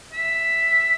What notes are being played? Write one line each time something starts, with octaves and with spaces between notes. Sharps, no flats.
E5